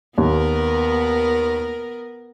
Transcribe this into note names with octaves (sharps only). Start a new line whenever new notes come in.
D#2 B3 A#4